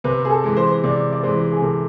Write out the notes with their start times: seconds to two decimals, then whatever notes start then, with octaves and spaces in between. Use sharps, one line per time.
0.04 C3 B4
0.25 G#4
0.30 A4
0.44 E3 G#3
0.57 C5
0.84 C3 D5
1.12 D5
1.23 E3 G#3 C5
1.52 G#4
1.62 C3 A4